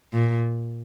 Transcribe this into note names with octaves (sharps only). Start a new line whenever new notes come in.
A#2